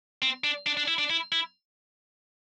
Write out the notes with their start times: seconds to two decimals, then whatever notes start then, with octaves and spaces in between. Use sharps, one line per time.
0.22 C4
0.44 D4
0.66 D4
0.77 D4
0.88 E4
0.98 D4
1.10 E4
1.32 E4